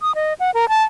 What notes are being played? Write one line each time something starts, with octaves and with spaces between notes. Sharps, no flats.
D#6
D#5
F#5
A#4
A5